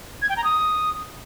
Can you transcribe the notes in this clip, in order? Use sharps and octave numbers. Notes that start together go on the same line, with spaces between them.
G#6
G5
A#5
D#6